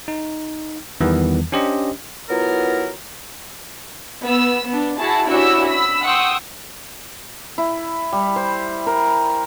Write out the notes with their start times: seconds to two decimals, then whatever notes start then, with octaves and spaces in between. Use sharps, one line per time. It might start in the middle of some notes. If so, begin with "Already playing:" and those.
0.08 D#4
1.01 E2 D#3 E3 G3 B3
1.52 C#4 D4 G4 C5 D#5
2.29 F#3 B3 E4 F4 A#4
4.24 B3 E6
4.68 B3 D4
4.98 E4 F#4 G#4 A5
5.27 C#4 D4 E4 F#4 G4 E6
5.67 B5 E6
6.04 F#5 G5 C6 C#6 D#6 E6
7.58 E4
8.13 G3
8.36 C5
8.87 A#4